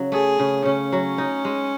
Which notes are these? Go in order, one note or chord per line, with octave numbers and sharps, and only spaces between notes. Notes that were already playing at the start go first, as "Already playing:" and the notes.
Already playing: C#3 F#3
A3 G#4
C#3
C#3 C#4
F#3
D#4
G#3